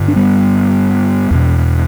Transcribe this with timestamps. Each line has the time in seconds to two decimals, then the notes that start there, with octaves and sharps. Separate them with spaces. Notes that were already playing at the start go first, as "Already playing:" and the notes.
Already playing: G2 D3
0.08 D4
0.16 G3 B3
1.31 E2 B2